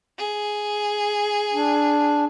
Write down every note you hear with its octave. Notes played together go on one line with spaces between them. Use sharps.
G#4
D4